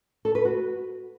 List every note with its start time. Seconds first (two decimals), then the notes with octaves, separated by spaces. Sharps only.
0.25 A4
0.35 B4
0.45 F#4